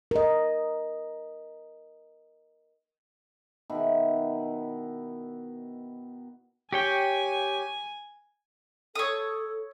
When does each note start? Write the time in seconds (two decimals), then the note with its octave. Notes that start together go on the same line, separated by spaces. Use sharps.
0.11 A#4 D#5
3.70 B2 D#3 E4
6.73 G4 C#5 G5 G#5
8.95 A4 C#5 D#6